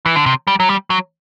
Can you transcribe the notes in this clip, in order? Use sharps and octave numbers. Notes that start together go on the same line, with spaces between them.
E3
D3
C3
G3
F#3
G3
F#3